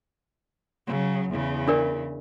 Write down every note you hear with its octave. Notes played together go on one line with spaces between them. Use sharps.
C#3 F#3
E2 C#3
D4 A#4 D5